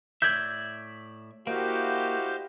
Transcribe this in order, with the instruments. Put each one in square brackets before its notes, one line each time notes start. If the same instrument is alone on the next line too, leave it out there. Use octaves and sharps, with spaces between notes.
[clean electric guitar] A2 D5 E5 [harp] G6 G#6
[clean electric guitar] A#3 [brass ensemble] E4 F#4 G4 [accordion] C5 D#5 F5